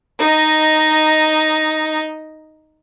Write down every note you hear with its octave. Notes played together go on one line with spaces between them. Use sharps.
D#4 D#5